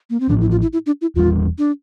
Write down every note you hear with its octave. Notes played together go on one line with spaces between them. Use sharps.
A#3
C4
A1 A2 F3 D4
E4
F4
E4
E4
D4
E4
E1 E2 E3 G3 F4
D4